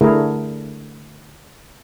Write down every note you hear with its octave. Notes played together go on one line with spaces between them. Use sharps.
D3 A3 E4 G#4 A#4